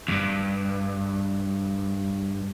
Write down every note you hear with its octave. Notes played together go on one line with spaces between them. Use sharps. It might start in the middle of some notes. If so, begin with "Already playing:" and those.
E2 G2